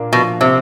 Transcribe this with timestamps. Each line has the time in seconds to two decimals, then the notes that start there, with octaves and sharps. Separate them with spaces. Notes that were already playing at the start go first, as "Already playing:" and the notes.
Already playing: A#2 A#3 D4
0.13 B2 F3
0.41 C3 C4